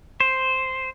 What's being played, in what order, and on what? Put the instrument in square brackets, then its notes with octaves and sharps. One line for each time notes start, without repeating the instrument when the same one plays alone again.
[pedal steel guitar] C5